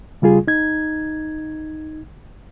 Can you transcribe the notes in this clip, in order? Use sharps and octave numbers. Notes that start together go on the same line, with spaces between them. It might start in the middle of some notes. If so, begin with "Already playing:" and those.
C#3 G3 F4 G#4
D#4 G#6